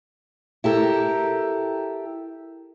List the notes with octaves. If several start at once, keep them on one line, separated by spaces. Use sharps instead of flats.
E4 G4 A4 A#4